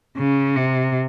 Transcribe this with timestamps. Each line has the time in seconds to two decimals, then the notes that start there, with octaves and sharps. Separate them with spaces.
0.17 C#3
0.56 C3